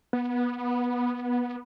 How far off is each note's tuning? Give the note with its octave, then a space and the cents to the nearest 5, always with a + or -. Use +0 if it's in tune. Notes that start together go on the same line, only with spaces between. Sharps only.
B3 -15